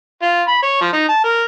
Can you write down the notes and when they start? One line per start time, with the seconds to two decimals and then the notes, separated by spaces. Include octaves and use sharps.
0.22 F4
0.48 B5
0.62 C#5
0.81 F3
0.93 D#4
1.09 A5
1.24 A#4